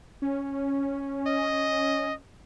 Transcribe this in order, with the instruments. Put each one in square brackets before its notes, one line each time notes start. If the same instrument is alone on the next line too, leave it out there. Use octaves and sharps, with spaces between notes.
[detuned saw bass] C#4
[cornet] D#5